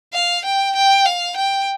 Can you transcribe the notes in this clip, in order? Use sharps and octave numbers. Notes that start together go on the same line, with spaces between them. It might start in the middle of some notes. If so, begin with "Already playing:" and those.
F5
G5
G5
F5
G5